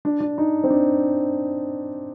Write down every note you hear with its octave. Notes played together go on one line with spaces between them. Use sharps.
D4
D4
D#4
C4
D4